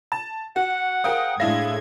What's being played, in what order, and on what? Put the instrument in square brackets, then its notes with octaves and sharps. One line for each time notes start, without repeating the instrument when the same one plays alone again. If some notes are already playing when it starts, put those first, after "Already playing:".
[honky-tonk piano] A5
[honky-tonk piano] F#4 [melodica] F#5
[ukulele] G#4 C5 F5 [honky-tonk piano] A#4 G5 D#6
[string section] A2 G#3 G#6 [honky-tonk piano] D4 E4 A#6 [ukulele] F5